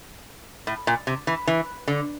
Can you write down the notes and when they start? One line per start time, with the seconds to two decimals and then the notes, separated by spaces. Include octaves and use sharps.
0.67 A2
0.87 A#2
1.07 C3
1.27 E3
1.47 E3
1.88 D3